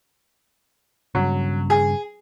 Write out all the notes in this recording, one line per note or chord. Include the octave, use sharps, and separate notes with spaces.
G2 C#3 F#3
G#4